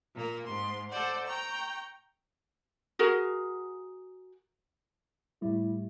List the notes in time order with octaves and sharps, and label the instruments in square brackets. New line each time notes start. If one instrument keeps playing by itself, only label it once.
[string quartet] A#2 A#3 A#4
G#2 C6
A4 C5 D5 F#5
G5 A#5 C#6
[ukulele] F#4 G#4 A#4
[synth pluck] A2 G3 [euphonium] E4